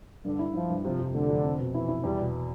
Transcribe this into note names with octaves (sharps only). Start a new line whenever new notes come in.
G2 D3
E4
F3 E4
G2
C3 F3
F2
D3 A3
F2
C4
B2
E3 E4
E4
E2 G3
B2